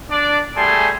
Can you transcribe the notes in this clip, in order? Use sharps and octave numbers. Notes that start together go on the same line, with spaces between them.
D4 D5
G3 A3 G#4 G#5 A5 C6